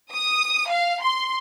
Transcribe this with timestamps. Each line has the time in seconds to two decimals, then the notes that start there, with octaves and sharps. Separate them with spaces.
0.12 D#6
0.70 F5
1.01 C6